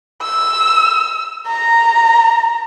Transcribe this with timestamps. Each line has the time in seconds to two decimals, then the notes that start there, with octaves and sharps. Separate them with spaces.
0.22 E6
1.47 A#5